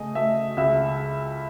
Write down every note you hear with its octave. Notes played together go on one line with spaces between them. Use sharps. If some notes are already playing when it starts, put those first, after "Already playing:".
Already playing: C#3 A3 G#4 D#5
A3 E5
C#2 E5